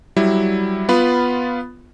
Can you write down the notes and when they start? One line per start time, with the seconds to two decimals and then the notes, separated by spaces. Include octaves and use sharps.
0.16 F#3 G3 E4
0.89 B3 F4 B5